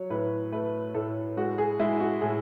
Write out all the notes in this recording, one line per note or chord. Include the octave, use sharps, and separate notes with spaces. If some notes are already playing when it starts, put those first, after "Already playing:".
Already playing: F#3 C#5
A2 B4
A3 B4
A2 A4
G#3 F#4
G#4
G#3 E4
F#4
A2 G#4